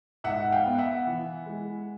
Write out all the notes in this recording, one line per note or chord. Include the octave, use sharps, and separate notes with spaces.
G#2 E5 F#5
F5 G5
B3
E5 F#5
E3
G#3